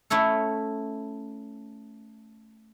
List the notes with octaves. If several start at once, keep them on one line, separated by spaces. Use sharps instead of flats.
A3 C#4 E4 A4